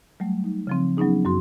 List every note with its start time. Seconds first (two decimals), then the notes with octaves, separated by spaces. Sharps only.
0.20 F#3 G3 A3
0.44 D#4
0.67 C#3 F3 C4
0.97 F#3 B3 C#4 D#4 G#4
1.25 F#2 F#4 C6